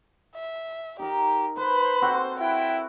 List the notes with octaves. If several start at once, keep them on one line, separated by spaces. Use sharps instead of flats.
E5
D#4 G4 A#4
B4 C5 B5
C4 F#4 A4
E4 G5